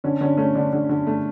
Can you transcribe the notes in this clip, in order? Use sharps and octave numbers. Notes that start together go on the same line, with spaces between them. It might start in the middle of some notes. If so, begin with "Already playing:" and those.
D3 C#4
D3 C#4
A3 C#4
D3 D4
D3
D3
A3